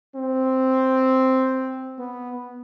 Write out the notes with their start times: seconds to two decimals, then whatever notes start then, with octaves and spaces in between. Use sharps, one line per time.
0.15 C4
1.99 B3